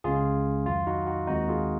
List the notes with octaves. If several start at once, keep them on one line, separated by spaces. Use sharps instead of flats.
C#2 C#3 G#3 C#4 F4 G#4
F2 D#3 F#3 F4
D#4 F#4
D#4 F#4
D#2 D#3 G#3 C4 D#4 F#4
F4 G#4